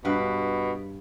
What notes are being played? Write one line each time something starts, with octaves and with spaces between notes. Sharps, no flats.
G2 B2 B4